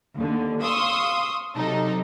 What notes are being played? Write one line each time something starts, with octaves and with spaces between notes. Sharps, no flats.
D#2 D3
F5 C6 C#6 D#6 E6
C3 F#3 D#4 A4